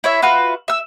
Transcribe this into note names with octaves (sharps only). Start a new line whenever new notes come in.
E4 C#5 E5
F4 F#4 B4 E5
E5 E6